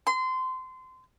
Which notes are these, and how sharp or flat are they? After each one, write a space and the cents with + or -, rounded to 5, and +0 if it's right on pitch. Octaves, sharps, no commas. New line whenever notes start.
C6 -25